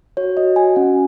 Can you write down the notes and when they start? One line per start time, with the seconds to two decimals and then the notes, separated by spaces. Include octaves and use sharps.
0.17 F#4 C#5
0.37 F#4 D#5
0.56 F#4 G#5
0.76 C#4 F#5